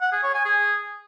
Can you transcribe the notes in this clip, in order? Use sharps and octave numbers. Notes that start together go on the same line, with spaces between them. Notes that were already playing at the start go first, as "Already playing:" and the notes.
F#5
G#4
C#5
G#5
G#4